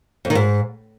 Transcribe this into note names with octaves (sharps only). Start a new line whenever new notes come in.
F2
D#3
G#2